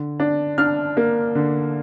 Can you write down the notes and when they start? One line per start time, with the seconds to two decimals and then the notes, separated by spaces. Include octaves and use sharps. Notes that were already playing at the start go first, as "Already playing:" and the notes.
Already playing: D3
0.20 D4
0.58 D4 F6
0.97 A#3
1.35 D3